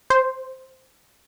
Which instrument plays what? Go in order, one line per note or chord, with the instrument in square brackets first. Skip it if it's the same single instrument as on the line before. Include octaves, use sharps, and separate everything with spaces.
[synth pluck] C5